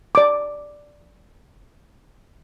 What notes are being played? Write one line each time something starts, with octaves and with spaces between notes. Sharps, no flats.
D5 D6